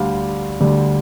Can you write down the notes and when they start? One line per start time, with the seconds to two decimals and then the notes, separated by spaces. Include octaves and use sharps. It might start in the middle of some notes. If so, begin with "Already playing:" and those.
Already playing: D2 D3 G3 F5
0.60 D2 D3 G3